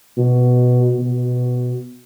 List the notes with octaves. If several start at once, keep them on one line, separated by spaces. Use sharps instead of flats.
B2
B2